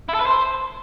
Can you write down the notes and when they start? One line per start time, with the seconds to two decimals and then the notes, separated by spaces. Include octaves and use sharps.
0.09 E4
0.15 A4
0.21 B4
0.26 C5